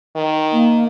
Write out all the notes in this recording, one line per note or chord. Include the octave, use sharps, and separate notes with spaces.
D#3
A#3